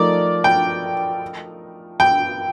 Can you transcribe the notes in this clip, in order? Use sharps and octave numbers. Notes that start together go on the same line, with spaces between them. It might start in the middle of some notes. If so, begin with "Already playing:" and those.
Already playing: F3 A3 D#4 A#4 D5
G5
G5